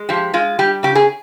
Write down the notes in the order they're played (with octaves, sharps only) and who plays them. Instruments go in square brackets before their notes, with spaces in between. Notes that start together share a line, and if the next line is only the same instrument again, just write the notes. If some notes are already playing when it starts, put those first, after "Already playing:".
Already playing: [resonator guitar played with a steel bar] G#3
F3 G4
G#3 F4
G3 G4
C#3 G4
G#4